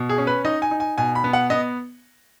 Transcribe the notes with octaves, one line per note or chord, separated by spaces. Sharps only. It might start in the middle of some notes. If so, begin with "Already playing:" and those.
Already playing: B2
G#4
C#4
B4
D#4 D#5
G#5
D#4
G#5
B2 G#5
B5
B3
F#5
B3 D#5